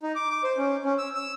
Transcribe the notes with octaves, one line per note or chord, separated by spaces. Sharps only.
D#4
D6
D6
C5
C#4
C#4
E6
E6